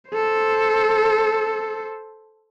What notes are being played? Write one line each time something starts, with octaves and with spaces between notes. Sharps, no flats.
A4 C5